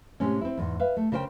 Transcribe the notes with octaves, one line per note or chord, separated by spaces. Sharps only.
A2 C3 G#3 C4 C#4
C4 E4
E2 G#2
B4 E5 F5
A3
C#3 A#4 C5 F5 G5